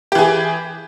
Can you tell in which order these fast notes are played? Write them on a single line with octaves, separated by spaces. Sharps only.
G4 E3 G#4